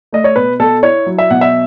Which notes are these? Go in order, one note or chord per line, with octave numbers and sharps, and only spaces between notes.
A3 D#5
C#5
B2 B4
B2 A4
E4 C#5
F#3
E5
B2 F#5
E5